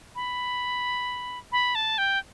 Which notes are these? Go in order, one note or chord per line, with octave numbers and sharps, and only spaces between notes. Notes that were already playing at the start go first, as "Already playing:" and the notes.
B5
B5
A5
G5